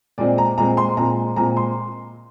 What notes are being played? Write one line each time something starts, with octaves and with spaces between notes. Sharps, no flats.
A#2 G#3 C4 D5
A#5
A#2 G#3 C4 A#5
C6
A#2 G#3 C4 A#5
A#2 G#3 C4 A#5
C6